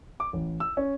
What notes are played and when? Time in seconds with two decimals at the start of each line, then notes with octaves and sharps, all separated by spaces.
0.20 D6
0.33 A1
0.60 E6
0.77 C#4